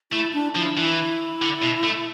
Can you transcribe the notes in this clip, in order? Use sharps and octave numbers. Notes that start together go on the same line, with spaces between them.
A3 E4
D4
F3 E4
E3 E4
D3
B2
A3